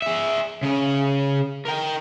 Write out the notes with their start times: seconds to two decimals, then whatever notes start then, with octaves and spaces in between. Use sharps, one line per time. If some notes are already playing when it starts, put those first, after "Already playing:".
0.02 G#4 E5
0.63 C#3 C#4
1.65 A#4 G5